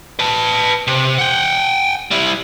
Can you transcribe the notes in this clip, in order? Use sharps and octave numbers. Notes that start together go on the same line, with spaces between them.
B4 A5
C3
F#5 G5
G3 E4